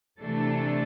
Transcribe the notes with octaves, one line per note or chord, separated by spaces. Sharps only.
C3 E3 A3 D4 A4